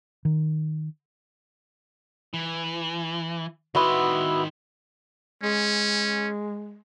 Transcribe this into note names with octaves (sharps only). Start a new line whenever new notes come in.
D#3
E3
D#3 B3 E4 F#4 C6
G#3 C#4